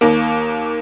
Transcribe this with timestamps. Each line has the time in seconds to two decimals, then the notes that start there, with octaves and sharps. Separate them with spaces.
0.01 D#2 A#3